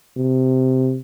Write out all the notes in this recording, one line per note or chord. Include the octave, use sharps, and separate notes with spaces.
C3